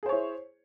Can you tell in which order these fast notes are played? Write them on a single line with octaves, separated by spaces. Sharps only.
G#4 C5 C#5 E4